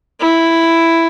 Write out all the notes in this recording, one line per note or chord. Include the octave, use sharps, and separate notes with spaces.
E4